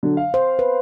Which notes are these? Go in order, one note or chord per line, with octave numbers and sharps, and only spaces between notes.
D3 F#3
F5
C5
B4